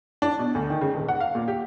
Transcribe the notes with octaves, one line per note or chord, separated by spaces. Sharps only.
D4
B2
D2
D#3
C#3
D#1
F#5
F5
A#2
G4